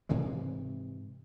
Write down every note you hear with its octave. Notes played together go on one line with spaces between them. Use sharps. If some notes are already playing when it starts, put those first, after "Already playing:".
G#2 C3 E3 G#3